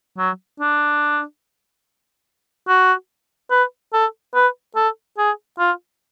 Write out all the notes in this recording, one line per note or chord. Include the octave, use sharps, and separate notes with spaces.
F#3
D4
F#4
B4
A4
B4
A4
G#4
F4